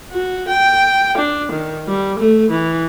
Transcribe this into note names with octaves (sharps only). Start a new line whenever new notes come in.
F#4
G5
D4
D#3
G3
A3
E3